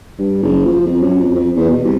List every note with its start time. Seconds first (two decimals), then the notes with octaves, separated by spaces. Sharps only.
0.19 G2
0.42 F#1
0.65 F3
0.86 F2
1.01 F#2
1.20 F2
1.35 F2
1.56 E2
1.71 B2
1.84 C2